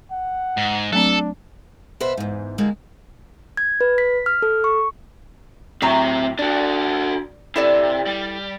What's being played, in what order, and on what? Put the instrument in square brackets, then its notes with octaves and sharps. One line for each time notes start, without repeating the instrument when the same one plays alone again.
[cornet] F#5
[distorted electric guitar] G#2
[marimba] F#3 A3 C4 [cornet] D4 [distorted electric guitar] A4
[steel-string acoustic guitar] B2 B4 C5 E5
E2 G#2
D3 G3 G#3 A#3
[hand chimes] G#6
B4
B6
F6
A4
C#6
[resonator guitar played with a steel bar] A2 F#3 A#5 [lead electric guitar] C4 E5
[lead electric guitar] D4 F#4 [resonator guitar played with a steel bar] D5
[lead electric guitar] C3 [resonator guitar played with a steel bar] E4 A4 D5
[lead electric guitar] G3